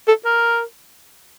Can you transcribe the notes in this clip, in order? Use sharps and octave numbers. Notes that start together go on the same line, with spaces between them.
A4
A#4